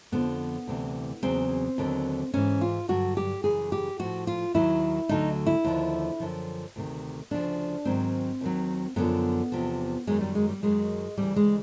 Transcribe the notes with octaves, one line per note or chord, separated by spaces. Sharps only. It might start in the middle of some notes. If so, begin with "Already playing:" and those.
F2 D3 F3 B3
D2 C3 E3
E2 C#3 F#3 C4
D#2 D3 F#3
G#2 E3 C#4
F4
G2 D3 F#3 F#4
G4
F#2 C#3 E3 G#4
G4
A2 F3 F#4
F4
D#2 D#3 F#3 E4
D2 D3 F#3 D#4
E4
D#2 D3 F3
F#2 D3 F3
D2 C3 D#3
D2 C#3 F3 D4
G#2 D#3 F#3 C4
D#2 D#3 F#3
F#2 D3 F3 B3
E2 C3 F3
F#2 D#3 F#3 G#3
G3
G#3
G3
F#2 D#3 F#3 G#3
D2 C#3 E3 G3
G#3